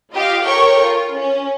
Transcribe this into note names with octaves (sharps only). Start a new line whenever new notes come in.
F4 G4 D#5 F5
G4 A4 A#4 C#5 G5 C#6
F4
C#4